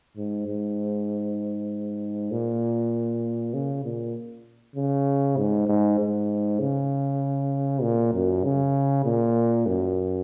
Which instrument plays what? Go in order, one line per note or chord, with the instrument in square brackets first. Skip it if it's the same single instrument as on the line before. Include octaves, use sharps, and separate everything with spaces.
[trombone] G#2
G#2
A#2
C#3
A#2
C#3
G#2
G#2
G#2
C#3
A#2
F#2
C#3
A#2
F#2